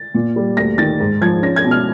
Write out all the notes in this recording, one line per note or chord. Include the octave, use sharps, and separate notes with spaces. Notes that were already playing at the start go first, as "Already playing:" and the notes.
Already playing: A6
A#2
G3
D2 A#6
D#3 A6
G#2
F3 G#6
C#4 A#6
G#6
B2
F6